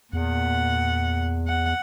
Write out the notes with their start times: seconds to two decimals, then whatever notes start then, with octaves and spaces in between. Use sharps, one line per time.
0.13 E2 A#2 F#5
1.48 F#5